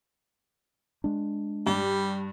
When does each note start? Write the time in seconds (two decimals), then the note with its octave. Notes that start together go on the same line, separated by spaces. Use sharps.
1.04 G#3 D4
1.67 G2 G3